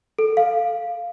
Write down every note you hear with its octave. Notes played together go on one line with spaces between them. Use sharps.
A4
F5